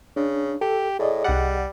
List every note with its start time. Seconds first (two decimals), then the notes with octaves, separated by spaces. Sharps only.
0.16 C#3 D4
0.61 G4 A4
0.99 A2 G#4 D5 D#5
1.24 C2 G3 F#5